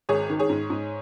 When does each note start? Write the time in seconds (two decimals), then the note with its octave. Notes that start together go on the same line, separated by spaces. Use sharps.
0.09 G#1 G#4 C#5
0.29 D#3
0.39 G#4 C#5
0.49 G#2
0.70 G#2